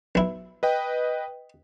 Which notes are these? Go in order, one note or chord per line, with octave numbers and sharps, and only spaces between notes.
B1 E4
B4 D#5 G5